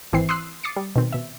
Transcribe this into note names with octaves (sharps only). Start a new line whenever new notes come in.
G#1 E3 C4 C7
C6 D#6 E6 F#6 C7
D6 D#6 A6 C7 C#7
G3
B2 D#3 C4
B2 E5